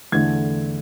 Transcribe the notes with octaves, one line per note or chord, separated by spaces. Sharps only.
E2 D3 A3 G#6